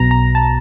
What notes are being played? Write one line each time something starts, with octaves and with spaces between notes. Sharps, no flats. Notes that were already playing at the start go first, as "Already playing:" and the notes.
Already playing: B1 B2 A#5
A#5
A5